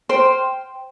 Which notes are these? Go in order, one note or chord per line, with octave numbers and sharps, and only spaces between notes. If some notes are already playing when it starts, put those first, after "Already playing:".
C5 G5 C6 F6